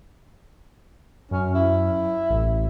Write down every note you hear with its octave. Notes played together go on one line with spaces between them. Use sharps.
F#2 C#4
E4
A1